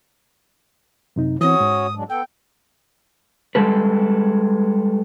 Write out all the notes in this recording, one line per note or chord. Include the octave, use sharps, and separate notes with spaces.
F#2 C3 D#4
E3 C4 C#4 F#4 C#5 D#6
G#2
F#3 G#3 D4
B3 A4 G5
G3 G#3 A4 B4